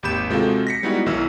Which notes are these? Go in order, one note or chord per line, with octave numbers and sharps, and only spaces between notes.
G#1 D#2 G4 B5 G6 E7
C3 G#3 F4 F#4 A4
A#6 B6 C#7
G3 G#3 B3 D#4 E4 F#4
B1 D#3 E4 E6